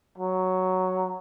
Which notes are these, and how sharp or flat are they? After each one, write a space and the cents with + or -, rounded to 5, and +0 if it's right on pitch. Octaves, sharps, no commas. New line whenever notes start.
F#3 +5